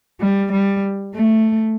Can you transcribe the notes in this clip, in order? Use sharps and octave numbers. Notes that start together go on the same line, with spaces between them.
G3
G3
A3